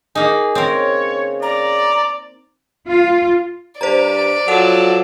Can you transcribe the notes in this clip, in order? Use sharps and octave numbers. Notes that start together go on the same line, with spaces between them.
A#3 D#4 G#4
C#3 C4 A#4 C#5
D5 A#5
F4
G2 C5 D5 A#5
F3 F#3 A4 F#5 A5